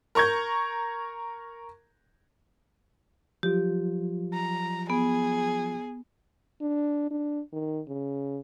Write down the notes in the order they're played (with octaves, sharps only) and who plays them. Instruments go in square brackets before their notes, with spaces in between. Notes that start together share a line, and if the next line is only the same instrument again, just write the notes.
[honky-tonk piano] A#4 A#5 C#6 G6 G#6
[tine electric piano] F3 F#3 F4 [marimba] G4
[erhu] A#5
[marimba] B3 [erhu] G#4
[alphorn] D4
D4
D#3
C#3